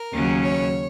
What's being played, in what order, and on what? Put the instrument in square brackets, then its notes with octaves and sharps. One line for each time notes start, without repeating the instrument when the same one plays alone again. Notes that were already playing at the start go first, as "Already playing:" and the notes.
Already playing: [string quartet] A#4
D#2 C#3 F#3 C#4
C#5